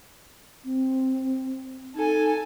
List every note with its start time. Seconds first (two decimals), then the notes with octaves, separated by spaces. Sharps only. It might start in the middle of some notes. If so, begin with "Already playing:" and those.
0.65 C4
1.95 D#4 A4 G#5